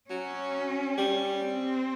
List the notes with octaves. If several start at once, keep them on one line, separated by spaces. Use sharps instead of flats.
F#3 C#4
G3
C4